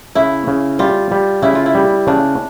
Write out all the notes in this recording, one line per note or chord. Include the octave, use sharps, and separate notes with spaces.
C#3 E4
C#3
G3 F4
G3
C#3 E4
F4
E4
G3
C#3 D4